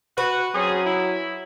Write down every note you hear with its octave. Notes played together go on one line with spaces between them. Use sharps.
F#4 B4
F#3 C4 C#4 G#4
E4